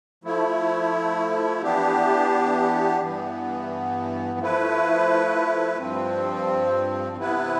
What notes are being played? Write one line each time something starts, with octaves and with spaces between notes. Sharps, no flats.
F3 A3 E4
E3 B3 D4 G4
G2 E3 B3
F3 A3 E4 B4
G2 F3 C4
C3 E3 B3 E4 B4